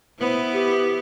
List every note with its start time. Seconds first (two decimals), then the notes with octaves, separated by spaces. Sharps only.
0.20 B3 E4 B4 C5 B5
0.54 G4